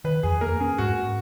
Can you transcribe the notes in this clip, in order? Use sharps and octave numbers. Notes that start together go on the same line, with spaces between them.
D#3 B4
F2 G#4
A#3 A#4
C#4 G#4
G#2 F#4